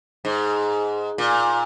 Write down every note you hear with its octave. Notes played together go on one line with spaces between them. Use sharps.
G#2
A#2